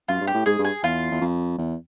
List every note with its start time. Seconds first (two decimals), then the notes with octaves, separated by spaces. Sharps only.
0.08 F#2 F4
0.21 G2
0.27 G4
0.34 A2
0.46 G#2 G#4
0.59 G2
0.65 G#4
0.83 E2 F4
1.12 E2
1.21 F2
1.58 E2